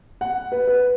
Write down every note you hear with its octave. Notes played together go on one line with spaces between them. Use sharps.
F#5
B4
B4